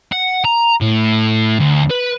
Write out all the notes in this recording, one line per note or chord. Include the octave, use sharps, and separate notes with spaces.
F#5
A#5
A2
D2
B4